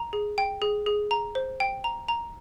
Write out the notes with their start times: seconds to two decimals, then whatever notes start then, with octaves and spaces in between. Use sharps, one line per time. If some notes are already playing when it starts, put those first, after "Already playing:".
Already playing: A#5
0.13 G#4
0.38 G5
0.62 G#4
0.86 G#4
1.11 A#5
1.35 C5
1.60 G5
1.84 A#5
2.08 A#5